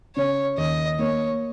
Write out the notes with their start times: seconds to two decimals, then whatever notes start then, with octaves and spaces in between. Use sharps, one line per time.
0.16 C#3 C#5
0.58 D#2 D#5
0.99 A#3 C#5